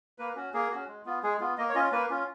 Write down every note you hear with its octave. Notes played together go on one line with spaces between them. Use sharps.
A#3 B4
C#4 F#4
A#3 G#4
C#4 F#4
G#3
B3 F4
G#3 G#4
B3 F4
A#3 D#5
C#5
C#4 F4 D#5
A#3 B4
C#4 F4